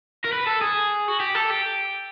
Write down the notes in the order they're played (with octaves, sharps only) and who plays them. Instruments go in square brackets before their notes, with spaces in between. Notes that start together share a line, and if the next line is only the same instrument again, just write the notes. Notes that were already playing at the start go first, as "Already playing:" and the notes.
[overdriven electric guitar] A#4
B4
A4
G#4
F#4
G4
A4
G4